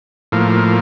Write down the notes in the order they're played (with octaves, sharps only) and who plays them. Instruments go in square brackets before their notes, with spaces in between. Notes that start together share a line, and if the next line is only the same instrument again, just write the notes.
[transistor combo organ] A2 F3 A#3